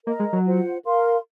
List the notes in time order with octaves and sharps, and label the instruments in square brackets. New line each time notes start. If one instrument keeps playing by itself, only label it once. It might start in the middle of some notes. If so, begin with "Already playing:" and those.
[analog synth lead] A#3 [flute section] A#4 D#5 A#5
[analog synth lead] G#3
F#3
[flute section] F4 C5 F#5
A#4 F5 C6